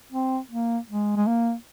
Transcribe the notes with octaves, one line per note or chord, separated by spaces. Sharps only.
C4
A#3
G#3
G#3
A#3